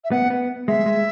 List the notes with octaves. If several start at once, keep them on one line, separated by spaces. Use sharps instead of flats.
E5
B3 F#5
B3
G#3 E5
G#3